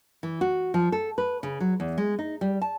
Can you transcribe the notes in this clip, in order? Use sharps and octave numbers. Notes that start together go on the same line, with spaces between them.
E3
F#4
F3
A4
B4
C#3
F#3
E2
G#3
D#4
G3
A5